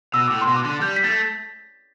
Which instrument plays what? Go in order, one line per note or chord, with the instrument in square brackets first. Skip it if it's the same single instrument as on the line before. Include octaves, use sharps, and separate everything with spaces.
[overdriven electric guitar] B2 [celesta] E6
[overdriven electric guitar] A2 [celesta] D6
[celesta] C6
[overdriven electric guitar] B2
[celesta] D6
[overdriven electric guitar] D3
[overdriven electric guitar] G3 [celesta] G6
[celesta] B6
[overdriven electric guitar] A3 [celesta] A6